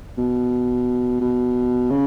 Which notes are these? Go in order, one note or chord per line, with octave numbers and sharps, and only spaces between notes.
B2
B2
C#3